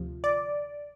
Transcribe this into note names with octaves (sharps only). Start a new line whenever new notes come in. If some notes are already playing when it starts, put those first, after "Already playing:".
Already playing: D2 C3 F3
D5